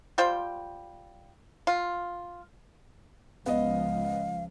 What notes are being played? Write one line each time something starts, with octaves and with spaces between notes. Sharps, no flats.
G3 F4 C5 G5
F4
C#2 F3 B3 D#5 F5